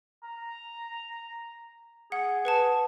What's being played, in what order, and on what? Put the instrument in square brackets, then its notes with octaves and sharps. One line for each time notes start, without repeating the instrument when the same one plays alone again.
[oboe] A#5
[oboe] G#4 [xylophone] F#5
[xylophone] B4 F#5 A5